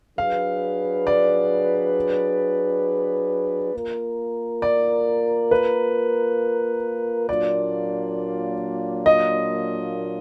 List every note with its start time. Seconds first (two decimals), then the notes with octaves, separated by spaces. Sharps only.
0.18 F#3 D4 G#4 B4 F5
1.07 D5
3.74 A#3 F4 A#4
4.62 D5
5.51 B4
7.29 A#2 F#3 A#3 D4 F4 D5
9.06 D#5